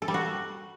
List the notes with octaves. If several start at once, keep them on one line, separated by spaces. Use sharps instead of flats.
A4
G3
F#4